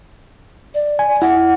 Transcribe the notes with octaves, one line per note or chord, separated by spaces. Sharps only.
D5
G#5
E4 F#5